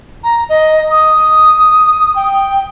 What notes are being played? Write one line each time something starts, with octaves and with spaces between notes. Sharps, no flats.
A#5
D#5
D#6
G5